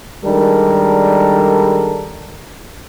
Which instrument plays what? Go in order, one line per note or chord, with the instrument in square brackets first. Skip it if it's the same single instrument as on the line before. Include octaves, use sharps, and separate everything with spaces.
[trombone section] D#3 G3 G#3 D4 A4 A#4